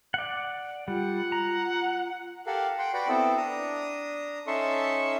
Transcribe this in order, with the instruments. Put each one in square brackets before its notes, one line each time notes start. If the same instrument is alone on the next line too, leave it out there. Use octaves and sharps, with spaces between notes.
[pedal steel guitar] D5 F#5
[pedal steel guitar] G3 [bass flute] F4 [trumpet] F#5
[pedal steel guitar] A#5
[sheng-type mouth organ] G4 A4 A#4 F5 F#5
F#5 G5 C6
F#4 B4 D5 F#5 G5
B3 C4 E4 A4
D4 A#5 D#6
C#4 D#4 A4 E5 C6 C#6